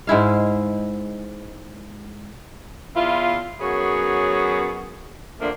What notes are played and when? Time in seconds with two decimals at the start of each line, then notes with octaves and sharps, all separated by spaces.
0.07 G#2 G#3 E4 F5
2.96 E2 E4 F4
3.60 F#2 B3 F#4 G#4 C#5
5.40 D3 F3 A3 A#3 D4